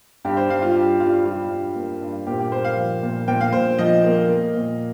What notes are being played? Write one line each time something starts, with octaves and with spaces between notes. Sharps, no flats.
G2 G4
C5
G2 F5
F4
G2 G4
G3 F4
G3 F4
G2
A#3
G2
A#2 G4
G4
A#3 C5
F5
F3
A#2
A#2 G5
F5
A#2 C5
F3 D#5
A#3
A#3
A#2